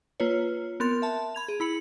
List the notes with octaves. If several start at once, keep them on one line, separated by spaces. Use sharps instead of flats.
A#3 F4 B4 C#5
B3 C4 A#4 C6 A6
E5 A5
B5 G#6 F7
G#4
E4 B5 C#7 F#7